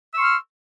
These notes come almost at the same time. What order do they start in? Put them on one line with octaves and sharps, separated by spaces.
E6 C#6 C6 F6